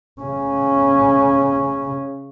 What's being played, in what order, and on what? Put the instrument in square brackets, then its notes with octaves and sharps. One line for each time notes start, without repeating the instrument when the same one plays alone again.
[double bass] C#3 C#4